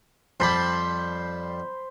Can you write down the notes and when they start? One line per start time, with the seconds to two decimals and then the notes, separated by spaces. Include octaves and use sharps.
0.40 F2 G3 C5 A5 B5